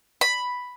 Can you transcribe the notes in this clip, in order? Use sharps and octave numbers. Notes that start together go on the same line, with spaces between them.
B5